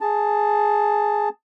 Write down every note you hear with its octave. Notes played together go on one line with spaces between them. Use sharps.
G#4 A5